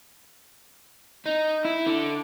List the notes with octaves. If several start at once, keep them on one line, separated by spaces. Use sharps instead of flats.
D#4
E4
D3